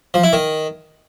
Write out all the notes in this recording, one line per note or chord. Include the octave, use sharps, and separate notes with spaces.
F3
E4
D#3